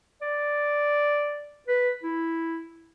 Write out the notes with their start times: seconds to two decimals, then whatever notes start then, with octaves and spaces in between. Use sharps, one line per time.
0.22 D5
1.68 B4
2.03 E4